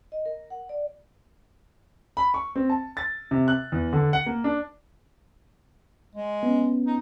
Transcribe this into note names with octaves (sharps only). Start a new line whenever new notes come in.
D#5
A#4
F#5
D5
B5
C#6
C4
A5
A6
C3
F#6
E2
D3
F#5
A#3
D4
G#3
B3 C#4
D#4